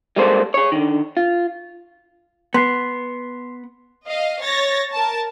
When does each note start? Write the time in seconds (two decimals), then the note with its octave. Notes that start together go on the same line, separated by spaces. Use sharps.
0.16 G3 G#3 A#3 A4 A#4 C5
0.54 G#4 C#5
0.72 D3 D#3
1.17 F4
2.54 B3 C6 C7
4.07 D#5 F5
4.43 C#5 A6 A#6
4.94 A#4 A5